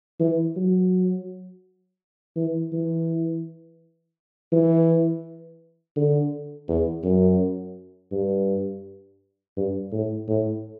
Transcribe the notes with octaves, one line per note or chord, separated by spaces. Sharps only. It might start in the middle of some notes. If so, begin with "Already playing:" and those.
E3
F#3
E3
E3
E3
D3
E2
F#2
G2
G2
A2
A2